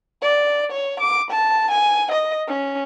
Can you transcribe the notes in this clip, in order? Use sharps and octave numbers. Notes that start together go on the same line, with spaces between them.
D5
C#5
D6
A5
G#5
D#5
C#4